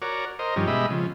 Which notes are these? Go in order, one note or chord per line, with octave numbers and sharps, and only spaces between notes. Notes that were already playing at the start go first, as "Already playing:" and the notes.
F#4 A#4 C#5 D5
A#4 C5 D#5
G2 D#3 F3 G3 C#4
B2 G#3 G4 D#5 E5 B5
C#3 F3